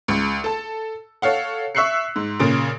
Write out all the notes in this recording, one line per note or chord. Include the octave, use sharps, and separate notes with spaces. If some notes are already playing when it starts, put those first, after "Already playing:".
C#2
A4 A5
A4 C#5 F5 F#5
E5 C#6 E6 F#6 C7 C#7
G#2
A#2 C#3 A6 D7